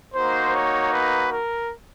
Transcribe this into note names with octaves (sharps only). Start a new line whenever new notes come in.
A#3 D#4 F#4 C5
C#5
B4
A#4